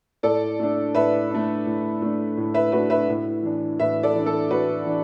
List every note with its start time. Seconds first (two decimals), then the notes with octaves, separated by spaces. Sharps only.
0.23 A2 A4 D5
0.60 A3 D4
0.95 A2 B4 E5
1.30 A3 D4
1.66 A2
2.02 A3 D4
2.37 A2
2.54 B4 E5
2.72 A3 D4 F#4 B4
2.90 B4 E5
3.09 A2
3.43 E3 D4
3.80 A2 B4 E5
4.03 A4 D5
4.15 E3 D4
4.26 A4
4.50 A2 F#4 B4
4.86 E3 D4